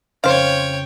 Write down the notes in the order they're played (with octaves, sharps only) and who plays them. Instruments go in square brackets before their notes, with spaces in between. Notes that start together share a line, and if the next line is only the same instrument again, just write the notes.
[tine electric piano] F2 C#3 C#4 [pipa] C5 F5 [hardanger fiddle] C#5 G5